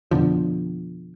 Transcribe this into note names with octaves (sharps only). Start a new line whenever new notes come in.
F2 B2 D3 F3